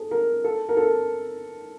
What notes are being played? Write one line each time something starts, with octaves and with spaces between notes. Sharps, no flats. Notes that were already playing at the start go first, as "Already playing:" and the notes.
Already playing: G#4 A4
A#4
A4
A#4
A4